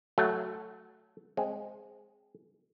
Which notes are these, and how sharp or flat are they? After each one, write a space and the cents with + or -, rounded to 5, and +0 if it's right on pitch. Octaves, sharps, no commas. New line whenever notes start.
F#3 +5 A3 +0
G#3 +0 C4 +0